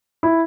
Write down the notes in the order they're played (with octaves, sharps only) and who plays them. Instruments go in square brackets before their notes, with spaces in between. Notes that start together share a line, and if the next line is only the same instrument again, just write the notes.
[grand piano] E4